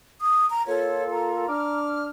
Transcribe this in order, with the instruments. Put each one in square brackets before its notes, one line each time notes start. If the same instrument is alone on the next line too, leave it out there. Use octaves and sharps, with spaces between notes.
[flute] D#6
A#5
[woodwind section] A#3 F4 A4 [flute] C#5
[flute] A#5
[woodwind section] D4 D6 F6